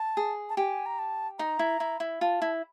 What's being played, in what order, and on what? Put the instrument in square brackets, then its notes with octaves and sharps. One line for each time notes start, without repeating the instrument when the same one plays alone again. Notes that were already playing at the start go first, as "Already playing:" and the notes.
Already playing: [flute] A5
[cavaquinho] G#4
[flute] A5
[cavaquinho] G4 [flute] G#5
[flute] A#5
A5
[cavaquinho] D#4 [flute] A#5
[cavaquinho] E4
E4
E4
[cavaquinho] F4 [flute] A5
[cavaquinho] E4